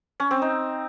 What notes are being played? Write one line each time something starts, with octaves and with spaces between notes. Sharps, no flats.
C#4
C4
D#4